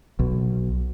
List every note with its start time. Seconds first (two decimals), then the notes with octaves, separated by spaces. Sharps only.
0.19 B1